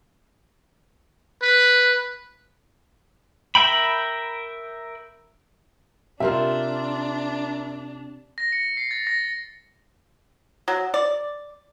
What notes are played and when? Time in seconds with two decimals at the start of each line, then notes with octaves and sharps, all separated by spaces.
1.42 B4
3.55 A#4 E5 G5 B5
6.20 C3 C4 D4 F4 A#4 E5
8.38 A#6
8.52 C#7
8.77 C7
8.91 A6
9.07 A#6
10.68 F#3
10.94 D5